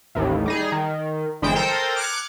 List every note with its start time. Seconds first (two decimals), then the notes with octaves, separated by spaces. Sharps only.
0.15 A1 D#2 A2
0.46 G3 D#4 G#4
0.72 D#3
1.42 G1 E3 G#3 C5 G5 D7
1.56 A4 A#4 C5 G5 A#5 D#6
1.97 D6 F6 F#6 G#6 C#7